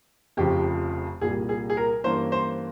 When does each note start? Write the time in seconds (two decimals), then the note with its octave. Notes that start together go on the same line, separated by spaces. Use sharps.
0.37 F1 F2 C#3 F3 G4
1.21 C2 A#2 G3 G#4
1.49 G#4
1.70 G#4
1.77 A#4
2.04 G2 E3 A#3 C#4 C5
2.32 C5